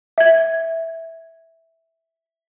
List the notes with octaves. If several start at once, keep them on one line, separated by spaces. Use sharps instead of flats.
E5 G#6